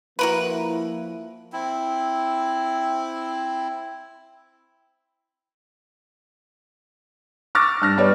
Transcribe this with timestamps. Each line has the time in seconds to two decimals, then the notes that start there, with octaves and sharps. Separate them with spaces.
0.19 F3 A#3 E4 F#4 A#4 B4
1.53 C4 E4
7.55 C#6 D6 E6 F6 A6 A#6
7.82 G2 F6 A#6
7.98 G3 B3 C#5 D5